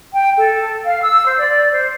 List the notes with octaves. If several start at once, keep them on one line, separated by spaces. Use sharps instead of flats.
G5
A4
F5
E6
C5
D5
C5